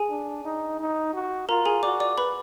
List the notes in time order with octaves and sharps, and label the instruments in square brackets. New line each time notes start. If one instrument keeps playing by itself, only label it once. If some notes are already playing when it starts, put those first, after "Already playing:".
Already playing: [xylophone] G#4 G#5
[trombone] D4
D#4
D#4
F#4
[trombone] F4 [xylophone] A#4 A#5
[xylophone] G#4 G#5
[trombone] F#4 [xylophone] D5 D6
[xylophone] D5 D6
B4 B5